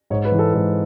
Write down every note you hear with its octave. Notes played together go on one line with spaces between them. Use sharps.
G#2 C#5
B4
E3
A4
G#2 A4